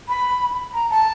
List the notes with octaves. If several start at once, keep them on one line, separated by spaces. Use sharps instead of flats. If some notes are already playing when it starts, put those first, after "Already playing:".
B5
A#5
A5